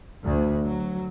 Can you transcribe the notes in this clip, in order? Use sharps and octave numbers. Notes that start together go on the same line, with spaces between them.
D2
F#3